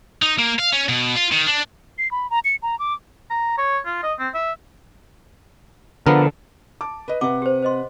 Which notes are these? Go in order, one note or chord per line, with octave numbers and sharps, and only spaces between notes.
D#4
A#3
F5
C#4
B2
F4
D#3
D4
C7
B5
A#5
C#7
A#5
D6
A#5
C#5
F4
D#5
C4
E5
D3 F3 B3 A#4
A5 D6
B4 D#5
C3 B4 E5 F#5 D6
G4 C5
C5 D#5 C6